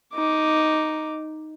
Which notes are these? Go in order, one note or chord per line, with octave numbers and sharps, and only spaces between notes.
D#4 D6